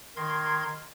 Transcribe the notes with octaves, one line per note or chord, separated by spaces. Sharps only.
D#3 A#4 C6 G#6